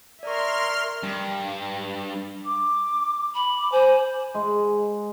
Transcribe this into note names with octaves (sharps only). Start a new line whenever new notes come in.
A#4 D5 E5 C6 C#6 F6
G2
D6
B5
D6
C5 G#5
G#3